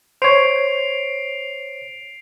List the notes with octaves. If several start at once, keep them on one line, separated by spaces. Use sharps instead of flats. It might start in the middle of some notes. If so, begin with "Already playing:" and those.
C5 C#5 C7 D7 F7